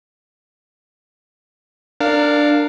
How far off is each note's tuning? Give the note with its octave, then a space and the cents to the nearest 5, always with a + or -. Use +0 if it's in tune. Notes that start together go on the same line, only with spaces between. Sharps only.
D4 +5 A#4 -25 F5 +0